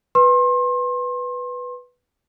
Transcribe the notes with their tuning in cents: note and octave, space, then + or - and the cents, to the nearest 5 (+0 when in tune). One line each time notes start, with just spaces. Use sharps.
B4 +0 C6 +30